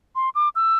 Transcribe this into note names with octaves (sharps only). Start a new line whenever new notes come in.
C6
D6
E6